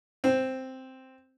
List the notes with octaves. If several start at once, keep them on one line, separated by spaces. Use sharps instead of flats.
C4